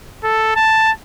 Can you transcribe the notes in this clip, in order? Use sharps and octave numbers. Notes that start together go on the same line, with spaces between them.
A4
A5